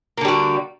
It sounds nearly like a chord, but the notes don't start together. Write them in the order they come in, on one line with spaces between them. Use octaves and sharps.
A#3 D3 G3 F#4